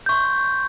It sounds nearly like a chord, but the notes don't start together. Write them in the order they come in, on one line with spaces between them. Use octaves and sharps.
G6 C#6 C6